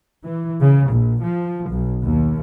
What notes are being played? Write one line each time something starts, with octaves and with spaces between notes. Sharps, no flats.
E3
C#3
A#1
F3
B1
D#2